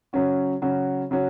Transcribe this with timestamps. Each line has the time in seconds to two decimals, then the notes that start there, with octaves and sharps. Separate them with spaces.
0.13 C#3 F#3 C#4 F#4
0.62 C#3 F#3 C#4 F#4
1.11 C#3 F#3 C#4 F#4